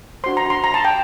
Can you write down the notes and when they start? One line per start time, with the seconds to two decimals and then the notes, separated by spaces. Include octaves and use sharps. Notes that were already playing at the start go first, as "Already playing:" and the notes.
0.24 D4 F#4 C5 C6
0.37 A#5
0.50 C6
0.64 A#5
0.74 A5
0.85 G5